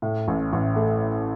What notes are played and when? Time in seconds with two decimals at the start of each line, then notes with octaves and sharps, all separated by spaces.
0.02 A2
0.28 A1
0.53 A1
0.76 A3